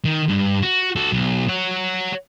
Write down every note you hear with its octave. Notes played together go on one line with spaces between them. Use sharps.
D#3
G2
F#4
F#4 A4
B1
C#5 F#5